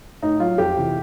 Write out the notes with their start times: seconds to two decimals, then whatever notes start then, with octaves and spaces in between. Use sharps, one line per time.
0.22 A2 D#4
0.40 F#3 F4
0.58 F2 G4
0.77 C3 E3